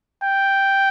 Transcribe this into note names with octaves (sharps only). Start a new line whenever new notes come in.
G5